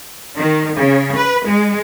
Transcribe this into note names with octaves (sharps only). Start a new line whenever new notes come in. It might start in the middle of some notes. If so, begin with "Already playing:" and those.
D#3
C#3
B4
G#3